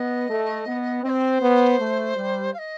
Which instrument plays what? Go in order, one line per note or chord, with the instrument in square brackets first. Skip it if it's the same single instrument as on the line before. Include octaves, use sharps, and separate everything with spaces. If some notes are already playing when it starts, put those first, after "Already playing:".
Already playing: [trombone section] B3 [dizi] D#5
[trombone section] A3
B3
[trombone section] C4 [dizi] D#5
[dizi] C5
[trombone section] B3
A3
G3
[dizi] F5
D#5